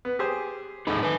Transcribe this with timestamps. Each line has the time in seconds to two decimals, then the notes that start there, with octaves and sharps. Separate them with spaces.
0.05 B3
0.19 G4 G#4 C5
0.87 A2 D#4 G#4 A4 B5
1.03 B4 G#5